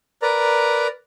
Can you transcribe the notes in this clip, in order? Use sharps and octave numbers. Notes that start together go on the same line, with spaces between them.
A#4 B4 D5 A#5